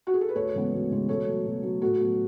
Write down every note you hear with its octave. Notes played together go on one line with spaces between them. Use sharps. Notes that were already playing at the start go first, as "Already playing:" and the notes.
F#4
G#4
A4
B4
D2 A4 C#5
C#3 E3 G#3 B3
D2
C#3 E3 G#3 B3
B2 A4 C#5
F#3 A3
B2
F#3 A3
A2 F#4 A4
F#3 B3